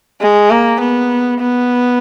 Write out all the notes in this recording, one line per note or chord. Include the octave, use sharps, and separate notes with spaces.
G#3
A#3
B3
B3